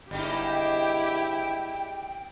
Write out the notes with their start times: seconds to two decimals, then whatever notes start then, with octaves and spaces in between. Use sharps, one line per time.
0.11 G1 G3 G#3 D#4 E4 G4 G5